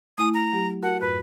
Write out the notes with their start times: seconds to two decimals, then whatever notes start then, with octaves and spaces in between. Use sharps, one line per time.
0.18 A3 E4 G#5 D#6
0.34 A#5
0.53 F#3 G4
0.83 F#4 A#4 F#5 A5
1.01 F2 G#2 B4 F#6